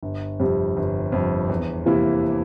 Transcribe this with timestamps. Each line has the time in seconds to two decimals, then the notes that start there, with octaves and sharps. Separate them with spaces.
0.03 G1
0.39 F2 C3 G3
0.77 G1
1.12 F2 C3 G3
1.49 E2
1.86 C3 E3 A#3 E4